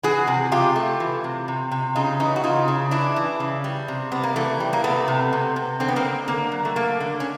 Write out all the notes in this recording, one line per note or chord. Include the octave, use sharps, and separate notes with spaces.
E3 F#4 G#4
C3
C3 F4 G4
A3
E3
C3
C3
C3
C#3 D#4 F4
E3 C#4 D#4
F#4
C#3 D#4 F4
C#3
E3 D4 E4
E3
C#3
G3
C3
C3 B3
A#3
E3 A3
G3
A#3
C3 A3 B3
C3
C3
C3
D3 C4
B3
A#3 C4
D3
D3 A#3
F#3
A3
A3 A#3
D3
C#4